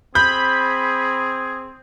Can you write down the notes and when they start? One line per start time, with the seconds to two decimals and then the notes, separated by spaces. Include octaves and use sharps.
0.15 C4 G#4 B5 G6